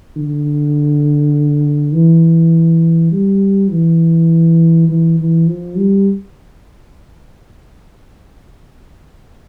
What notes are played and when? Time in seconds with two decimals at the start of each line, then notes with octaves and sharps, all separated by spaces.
0.16 D3
1.93 E3
3.12 G3
3.70 E3
4.89 E3
5.19 E3
5.47 F3
5.77 G3